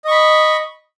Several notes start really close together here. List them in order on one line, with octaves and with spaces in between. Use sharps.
D#5 C#6 B5